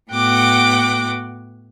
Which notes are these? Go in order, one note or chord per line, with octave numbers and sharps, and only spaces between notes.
A2 B3 F#4 F#5 G5 D6